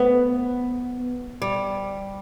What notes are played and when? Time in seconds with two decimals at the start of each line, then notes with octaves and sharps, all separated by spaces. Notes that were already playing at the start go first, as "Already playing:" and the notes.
Already playing: B3
1.42 G3